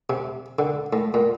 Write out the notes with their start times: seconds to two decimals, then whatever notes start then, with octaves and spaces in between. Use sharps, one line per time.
0.10 C3
0.59 D3
0.93 A2
1.14 A#2